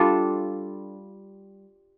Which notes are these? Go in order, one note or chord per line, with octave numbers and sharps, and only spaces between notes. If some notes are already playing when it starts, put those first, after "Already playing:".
Already playing: G3 D4 F4 A4